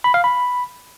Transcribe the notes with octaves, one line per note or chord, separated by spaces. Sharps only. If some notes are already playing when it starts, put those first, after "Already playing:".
B5
F5
B5